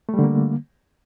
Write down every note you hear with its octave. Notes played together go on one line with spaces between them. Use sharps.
D3 G3 A3 A#3